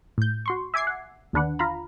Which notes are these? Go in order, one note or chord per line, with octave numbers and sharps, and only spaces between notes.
A2 G6
F#4 C6 C#6
E5 G#5 D6 G#6 C7
F#5
D#2 D3 D4 B4 F#5
F4 F5 A#5 B5